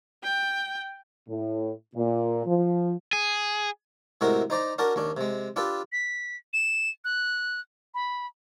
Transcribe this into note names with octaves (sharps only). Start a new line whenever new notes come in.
G5
A2
A#2
F3
G#4
A2 C3 G#3 F#4 A#4
D#4 C5 D5 A#5
C#4 D4 F#4 A#4 A5
D#2 C#4 D4
C3 G#3
D4 F4 G4 A4 B4
B6
E7
F#6
B5